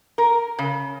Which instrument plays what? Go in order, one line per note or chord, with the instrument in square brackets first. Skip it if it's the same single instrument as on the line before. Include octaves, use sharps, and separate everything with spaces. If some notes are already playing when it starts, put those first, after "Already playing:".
[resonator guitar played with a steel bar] A#4
C#3